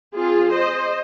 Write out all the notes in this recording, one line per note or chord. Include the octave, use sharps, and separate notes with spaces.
F3 C4 F4 G#4
C5 D#5